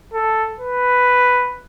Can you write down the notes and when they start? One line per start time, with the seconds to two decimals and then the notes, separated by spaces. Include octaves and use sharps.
0.13 A4
0.59 B4